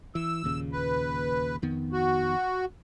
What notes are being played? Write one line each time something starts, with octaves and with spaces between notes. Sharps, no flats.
E3 E6
D#2 A#2 C#3
B4
F2 D#3 B3
F#4